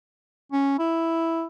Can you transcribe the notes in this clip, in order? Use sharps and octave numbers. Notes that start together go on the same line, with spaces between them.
C#4
E4